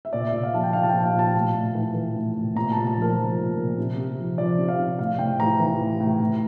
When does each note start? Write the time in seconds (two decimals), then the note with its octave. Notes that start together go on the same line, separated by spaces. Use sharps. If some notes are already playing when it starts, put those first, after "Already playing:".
0.05 E5
0.13 A#2 D5
0.29 A#2 E5
0.43 F5
0.54 F3 A5
0.63 G5
0.73 F3 F5
0.83 A5
0.89 A#2 G5
1.04 F5
1.14 A#2 A5
1.35 A2
1.54 A2
1.75 E3
1.95 E3
2.16 A2
2.36 A2
2.56 A#2 A#5
2.72 A#2 A5
2.87 A5
2.97 F3 A#4
3.17 F3
3.38 A#2
3.57 A#2
3.78 C3
3.97 C3
4.19 F3
4.38 F3 D5
4.58 C3
4.69 F5
4.79 C3
4.99 A2 F5
5.19 A2 G5
5.40 E3 A#5
5.60 E3
5.80 A2
6.00 A2
6.20 A2